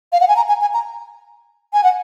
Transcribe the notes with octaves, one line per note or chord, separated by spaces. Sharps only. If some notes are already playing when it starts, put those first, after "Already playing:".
F5
F#5
G#5
A#5
G#5
G#5
A#5
G#5
F#5